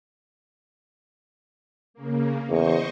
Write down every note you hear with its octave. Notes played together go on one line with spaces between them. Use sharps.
C#3 A#3
E2 C5 D#5 C#6